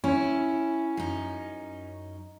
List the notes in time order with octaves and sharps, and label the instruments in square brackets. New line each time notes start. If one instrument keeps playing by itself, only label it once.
[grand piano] C#4 C#5 [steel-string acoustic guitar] E4
[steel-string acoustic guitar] F#2 D#4